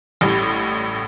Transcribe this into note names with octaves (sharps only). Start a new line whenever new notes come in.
A1 A2 G3